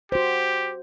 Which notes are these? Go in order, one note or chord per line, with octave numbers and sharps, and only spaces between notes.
F#4 G4 C5